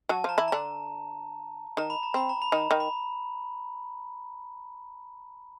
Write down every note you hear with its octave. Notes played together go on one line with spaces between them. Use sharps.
F#3 F#4 A5
F3 F4 A#5
E3 E4
D3 D4 A#5
D#3 D#4 A#5
B5
A#5
C4 B5
A#5
B5
D#3 D#4 A#5
D#3 D#4
B5